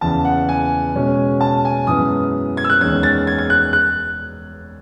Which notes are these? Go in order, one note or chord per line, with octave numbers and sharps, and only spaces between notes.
E2 C#3 E3 B3 A5
F#5
G#5
B2 G#3 C#4
A5
G#5
F#2 E3 G#3 B3 D#6
G#6
E6
F#6
E2 D#3 G#3 C#4 G#6
A6
G#6
G#6
F#6
F#6